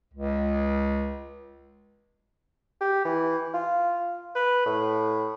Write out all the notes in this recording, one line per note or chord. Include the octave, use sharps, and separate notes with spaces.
C#2
G4
E3
F4
B4
A2